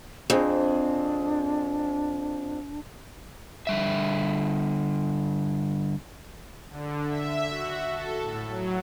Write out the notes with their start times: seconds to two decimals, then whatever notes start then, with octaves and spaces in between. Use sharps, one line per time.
0.30 F2 C4 D4 G#4 C5
3.67 D3 G3 E5
6.69 D3
7.07 E5
7.50 F#4
7.90 A4
8.20 A2
8.49 F#3